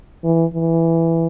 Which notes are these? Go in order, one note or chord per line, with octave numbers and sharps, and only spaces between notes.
E3
E3